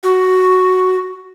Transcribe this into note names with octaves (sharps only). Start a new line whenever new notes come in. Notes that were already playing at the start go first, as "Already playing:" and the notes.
F#4